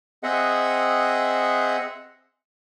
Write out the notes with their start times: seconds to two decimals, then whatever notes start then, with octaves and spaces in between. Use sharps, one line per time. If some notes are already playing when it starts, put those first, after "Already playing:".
0.23 C4 G#4 D#5 E5 F#5